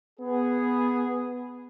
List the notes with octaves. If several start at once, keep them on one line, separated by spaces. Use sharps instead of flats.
B3 G#4